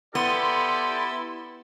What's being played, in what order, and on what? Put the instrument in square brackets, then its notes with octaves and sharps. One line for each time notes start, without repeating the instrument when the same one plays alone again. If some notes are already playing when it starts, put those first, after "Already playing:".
[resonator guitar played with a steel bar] B3 [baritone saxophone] E4 [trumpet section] G4 A4 D5 [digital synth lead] C6